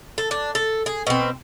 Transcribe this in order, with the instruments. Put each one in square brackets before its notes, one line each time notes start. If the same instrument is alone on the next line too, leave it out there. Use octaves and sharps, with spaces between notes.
[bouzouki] A4
D4
A4
G#4
B2 C4